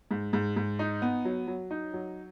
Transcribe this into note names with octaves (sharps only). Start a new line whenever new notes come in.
G#2
G#2
G#2
D#4
B3
F#3
F#3
D#4
F#3